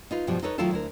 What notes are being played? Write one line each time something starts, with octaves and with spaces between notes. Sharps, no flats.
D#4 F4 B4
G2 B2 F3 G3
D#4 A4 B4 C#5
D#3 F#3 A3 E4 F4 A4
D2 E4 A#4